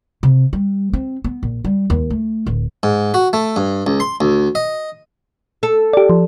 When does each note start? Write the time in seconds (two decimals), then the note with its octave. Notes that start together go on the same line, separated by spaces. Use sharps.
0.23 C3
0.53 G3
0.93 C4
1.24 B3
1.43 A#1
1.65 G3
1.90 D#2
2.10 A3
2.47 D1
2.83 G#2
3.14 F#4
3.33 A3
3.56 G2
3.87 C#2
4.00 C6
4.21 D2
4.55 D#5
5.63 A4
5.93 G4 D5
6.10 F3